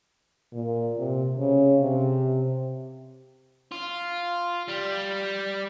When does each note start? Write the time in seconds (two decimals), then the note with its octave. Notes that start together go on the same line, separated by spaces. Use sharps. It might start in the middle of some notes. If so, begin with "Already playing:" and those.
0.53 A#2
0.98 C3
1.38 C#3
1.81 C3
3.72 F4
4.69 G3